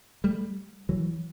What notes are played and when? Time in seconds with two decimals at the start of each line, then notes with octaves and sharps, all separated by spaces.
0.24 G3 A3
0.89 E3 F#3